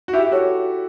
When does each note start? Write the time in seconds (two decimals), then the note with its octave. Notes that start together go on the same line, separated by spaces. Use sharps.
0.08 F#4
0.13 E4 G4 E5
0.26 G4
0.32 F#4 A4 C#5